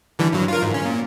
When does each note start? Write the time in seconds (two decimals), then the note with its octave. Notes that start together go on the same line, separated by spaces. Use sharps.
0.19 D3 E3 G3
0.32 G2 F#3
0.48 F4 A#4
0.62 G#2
0.74 C#4
0.85 A#2